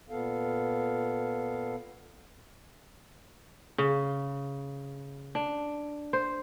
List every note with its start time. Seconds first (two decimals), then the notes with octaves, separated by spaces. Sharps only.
0.10 A#2 B3 A4 F5
3.78 C#3
5.35 D4
6.13 C5